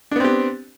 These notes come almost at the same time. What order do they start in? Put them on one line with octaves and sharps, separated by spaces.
D4 B3 C4 G4